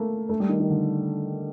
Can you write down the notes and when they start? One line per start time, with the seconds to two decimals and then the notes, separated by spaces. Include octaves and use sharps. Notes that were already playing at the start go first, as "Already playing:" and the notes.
Already playing: A3 A#3
0.29 A3
0.40 G3
0.49 D#3
0.59 D#3
0.70 D3